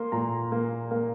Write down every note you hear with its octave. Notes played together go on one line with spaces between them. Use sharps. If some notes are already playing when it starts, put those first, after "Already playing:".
Already playing: A#3 C6
A#2 A#5
A#3
A#3